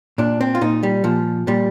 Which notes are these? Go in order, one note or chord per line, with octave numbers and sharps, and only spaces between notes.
A#2 D4
C4
F4
A#2 D#4
G3
A#2 F3
A#2 G3